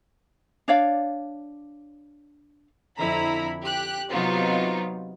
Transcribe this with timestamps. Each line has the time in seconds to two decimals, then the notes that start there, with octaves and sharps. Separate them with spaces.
0.68 D4 C#5 D5 F5
2.98 F2 D3 E4 A#5 B5
3.62 G4 F#6
4.10 C3 F#3 B3 D#4 F4